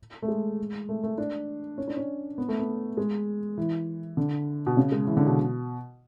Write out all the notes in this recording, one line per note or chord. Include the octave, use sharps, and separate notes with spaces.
A3
G#3
A3
A3
D4
C#4
D4
C#4
B3
A3
B3
G#3
E3
D3
B2
C#3
G#3
E3
D3
B2